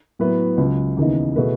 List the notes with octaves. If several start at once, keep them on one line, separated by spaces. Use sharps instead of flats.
A2 F#3 B3 E4 B4
C#2 C#3 F#3
D#2 C#3 E3 B3 D#4
B2 A3 E4 G#4 B4